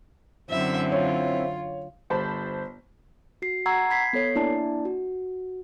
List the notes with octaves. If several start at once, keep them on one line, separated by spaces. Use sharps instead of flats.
F#2 D3 C4 E4 E5
F4 C#5
G1 C5 A5 B5
F#4 C7
F#5 A#5 C#6 E6 G#6 C7
B5 G#6 B6 C7
B3 A4 C#5 C7
A#3 D4 E4 D5 A5
F#4